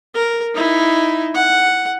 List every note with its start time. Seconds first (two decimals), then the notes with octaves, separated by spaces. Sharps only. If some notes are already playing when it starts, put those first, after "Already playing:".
0.14 A#4
0.55 D#4 E4
1.35 F#5